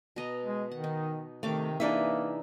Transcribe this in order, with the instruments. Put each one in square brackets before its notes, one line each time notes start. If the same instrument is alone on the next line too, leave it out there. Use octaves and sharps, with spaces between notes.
[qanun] B2 D#5 A#5
[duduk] G#3
[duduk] D#3 [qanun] F#5
[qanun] D#4
[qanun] C3 F5 D6 [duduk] D#3 [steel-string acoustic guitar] A3
[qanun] E3 G#4 D5 [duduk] A#3 [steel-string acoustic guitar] D4 D#4 E5